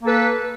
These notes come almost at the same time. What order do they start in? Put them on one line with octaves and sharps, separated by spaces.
A#3 A4 B4